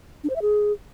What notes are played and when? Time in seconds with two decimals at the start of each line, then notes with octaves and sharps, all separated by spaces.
0.24 D4
0.30 C5
0.36 E5
0.42 G#4